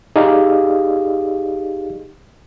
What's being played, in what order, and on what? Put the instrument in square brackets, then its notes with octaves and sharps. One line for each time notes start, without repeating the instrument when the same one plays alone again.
[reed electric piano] D#4 G4 G#4 D5 D#5 F5